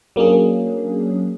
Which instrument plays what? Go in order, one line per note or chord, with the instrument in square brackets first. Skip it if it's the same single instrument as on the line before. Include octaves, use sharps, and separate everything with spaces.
[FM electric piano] F#3 A#3 C#4 D4 G#4